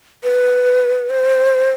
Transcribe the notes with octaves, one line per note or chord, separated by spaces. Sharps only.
B4
C5